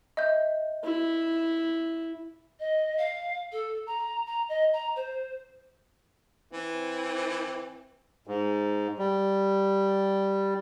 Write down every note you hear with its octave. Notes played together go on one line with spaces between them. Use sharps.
D#5 E5 G6
E4
D#5
F5
A4
A#5
A#5
D#5
A#5
C5
E3 C4
G#2
G3